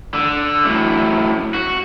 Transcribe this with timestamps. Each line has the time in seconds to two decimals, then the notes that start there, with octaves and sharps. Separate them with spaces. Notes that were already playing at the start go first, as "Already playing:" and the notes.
0.14 D3
0.64 F#2 A2
1.54 F#4